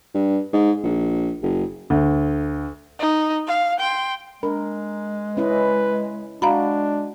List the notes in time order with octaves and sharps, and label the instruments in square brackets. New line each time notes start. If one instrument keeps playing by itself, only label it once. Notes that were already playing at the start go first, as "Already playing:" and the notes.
[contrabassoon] G2
G#2
A#1
F#1
[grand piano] D2
[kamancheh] D#4
F5
G5 C6
[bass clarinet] G#3 [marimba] D4 [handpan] A#4
[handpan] C#4 E4 D#5 [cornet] B4
[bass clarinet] G#3 [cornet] D4 [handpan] F#4 [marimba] F5 A#5 B5